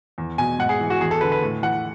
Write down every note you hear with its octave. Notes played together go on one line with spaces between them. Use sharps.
E2
B2 G#5
G#2 F#5
G#4
E3
F#4
E2 G#4
A4
D3 B4
B4
A2
E3 F#5